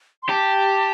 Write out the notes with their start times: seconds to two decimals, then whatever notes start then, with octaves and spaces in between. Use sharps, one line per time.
0.23 C6
0.29 G4 A5